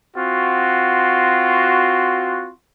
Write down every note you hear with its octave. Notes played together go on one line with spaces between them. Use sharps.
C4 F4 F#4